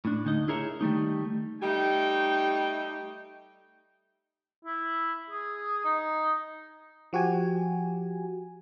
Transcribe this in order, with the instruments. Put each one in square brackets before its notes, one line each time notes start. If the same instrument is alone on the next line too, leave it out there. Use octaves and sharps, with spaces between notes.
[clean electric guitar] A2 D4
D2 D#4 D#5
E4 G#4 A#4 C#5 E5
D#3 G3 A3 D#4
[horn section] G3 A3 D#4 G4 G5
[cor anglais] E4
G#4
D#4
[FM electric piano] F3 F#4 G4 G#5